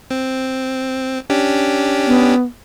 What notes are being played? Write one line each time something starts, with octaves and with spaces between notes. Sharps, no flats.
C4
C#4 D4 G4
B3